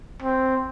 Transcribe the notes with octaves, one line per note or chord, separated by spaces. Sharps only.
C4